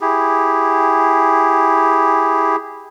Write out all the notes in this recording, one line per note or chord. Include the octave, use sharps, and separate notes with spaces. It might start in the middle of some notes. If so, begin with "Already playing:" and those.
E4 G4 G#4